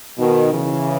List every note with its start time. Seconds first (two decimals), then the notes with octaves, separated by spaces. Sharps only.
0.18 B2 D#3
0.52 C#3 E3